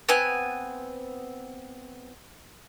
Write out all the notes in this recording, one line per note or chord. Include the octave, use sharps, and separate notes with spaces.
B3 C4 G#5 F#6